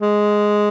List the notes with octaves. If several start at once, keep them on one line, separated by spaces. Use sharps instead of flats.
G#3